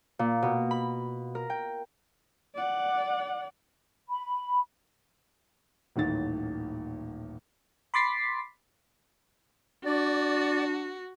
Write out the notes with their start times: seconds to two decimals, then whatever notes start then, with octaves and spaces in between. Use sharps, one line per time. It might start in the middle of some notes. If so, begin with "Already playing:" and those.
0.19 A#2
0.42 B2
0.71 B5
1.35 A#4
1.50 G5
2.55 D5 F#5
4.09 B5
5.96 D#1 A1 D#3 A6
7.94 B5 C6 D6 A6 B6 C7
9.85 D4 F#4 D5